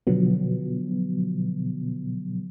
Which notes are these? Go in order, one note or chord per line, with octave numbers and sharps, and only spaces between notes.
B2 D3 F3 F#3 B3